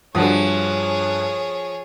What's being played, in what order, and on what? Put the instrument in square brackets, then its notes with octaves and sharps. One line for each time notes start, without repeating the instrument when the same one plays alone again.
[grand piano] G2 [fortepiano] D3 F#4 D#6 [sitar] F3 [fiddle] G#4 C#5